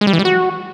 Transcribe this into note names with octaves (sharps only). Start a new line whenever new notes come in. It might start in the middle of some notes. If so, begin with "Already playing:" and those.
G#3
G3
E3
G3
F#4